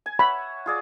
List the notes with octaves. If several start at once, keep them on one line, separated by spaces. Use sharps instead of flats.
G#5
C#5 E5 F#5 B5
F4 G#4 D5